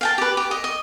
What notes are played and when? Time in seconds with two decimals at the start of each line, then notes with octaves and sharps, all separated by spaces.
0.01 F5 G5 A5
0.18 G4 B4
0.37 G4
0.51 D#5
0.64 D#5